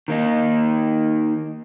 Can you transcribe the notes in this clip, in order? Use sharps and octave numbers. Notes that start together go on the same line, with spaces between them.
D#3 A#3 D#4